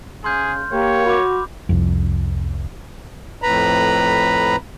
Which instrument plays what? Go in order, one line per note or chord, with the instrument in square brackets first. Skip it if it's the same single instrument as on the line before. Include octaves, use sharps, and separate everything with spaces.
[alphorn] C#3 [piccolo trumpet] G#4 [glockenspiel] C6 F6 G6
[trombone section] A#3 [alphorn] G4 [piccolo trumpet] C#5
[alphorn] F#4 [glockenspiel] B5 D6
[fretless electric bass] C2 F2
[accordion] F2 A2 B4 A#5 B5